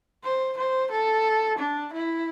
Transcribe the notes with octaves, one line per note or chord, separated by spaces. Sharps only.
C5
C5
A4
D4
E4